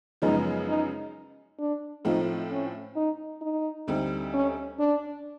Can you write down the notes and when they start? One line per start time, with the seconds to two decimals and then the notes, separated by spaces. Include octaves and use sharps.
0.22 F#2 C#3 F3 G#3 B3 D#4
0.68 D#4
1.59 D4
2.05 A2 F3 A3 C4 D#4 F4
2.51 C#4
2.96 D#4
3.41 D#4
3.87 D2 D3 G3 C4 D#4
4.33 C#4
4.79 D4